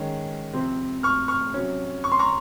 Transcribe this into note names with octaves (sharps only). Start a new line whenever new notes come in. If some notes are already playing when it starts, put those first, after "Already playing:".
Already playing: D#3 G#3 C#4
C3 F3 C4
C#6 F6
C#6 F6
C3 F#3 C#4
C#6
C6
A#5 C#6